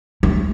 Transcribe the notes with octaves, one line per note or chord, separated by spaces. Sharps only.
A3